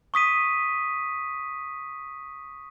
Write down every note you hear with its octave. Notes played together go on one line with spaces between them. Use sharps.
C#6 D#6 B6 D#7